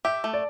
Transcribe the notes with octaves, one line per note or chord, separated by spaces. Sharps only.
G4 E5
A3
D5